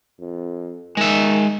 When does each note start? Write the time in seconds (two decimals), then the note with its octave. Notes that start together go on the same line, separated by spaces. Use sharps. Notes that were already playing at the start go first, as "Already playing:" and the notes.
0.19 F2
0.97 D#3 G#3 E5